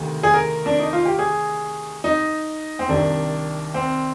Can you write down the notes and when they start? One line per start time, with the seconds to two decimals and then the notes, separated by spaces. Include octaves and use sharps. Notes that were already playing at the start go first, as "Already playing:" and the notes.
Already playing: D2 C3 D#3
0.23 G#4
0.34 A#4
0.66 D4
0.80 D#4
0.93 F4
1.05 G4
1.19 G#4
2.04 D#4
2.79 C4
2.89 C2 C3 D#3 D4
3.74 C4